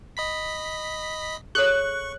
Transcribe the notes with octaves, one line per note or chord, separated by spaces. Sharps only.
D#5 B5 B6
G#4 A4 C#5 C#6 F#6